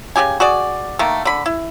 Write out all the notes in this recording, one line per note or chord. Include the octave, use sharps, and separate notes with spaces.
C#3 F4 G4 G#5
F#4 G#4 D5
D#3 A3 A#3
D3 B5
E4